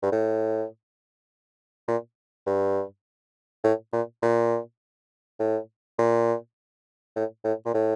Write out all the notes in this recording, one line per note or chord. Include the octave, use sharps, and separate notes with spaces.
G2
A2
A#2
G2
A2
A#2
A#2
A2
A#2
A2
A2
A#2
A2